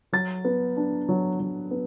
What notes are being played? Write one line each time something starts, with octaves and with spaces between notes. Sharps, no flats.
F#3 A6
B3
D4
F#3
F#3
B3